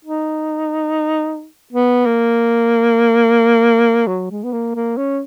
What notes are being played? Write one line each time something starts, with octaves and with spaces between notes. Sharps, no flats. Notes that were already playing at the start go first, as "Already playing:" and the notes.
D#4
B3
A#3
F#3
G#3
B3
A#3
A#3
C#4